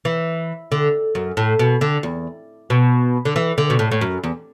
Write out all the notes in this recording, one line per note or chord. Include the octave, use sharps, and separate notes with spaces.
E3
D3
F#2
A2
B2
D3
E2
B2
D3
E3
D3
B2
A2
A2
F#2
E2